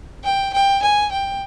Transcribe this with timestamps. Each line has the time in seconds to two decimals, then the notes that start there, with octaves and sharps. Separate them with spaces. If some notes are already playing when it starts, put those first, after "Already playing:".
0.24 G5
0.53 G5
0.82 G#5
1.11 G5